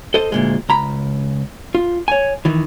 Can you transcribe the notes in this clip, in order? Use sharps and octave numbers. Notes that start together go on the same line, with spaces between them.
A4 C5 D#5
D2 A#2 G#3
C#2 A#5 B5
F4
C#5 G#5
D#3 E3